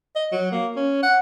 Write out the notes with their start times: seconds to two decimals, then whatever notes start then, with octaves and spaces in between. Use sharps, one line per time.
0.15 D#5
0.32 F#3
0.52 A#3
0.76 C#4
1.03 F#5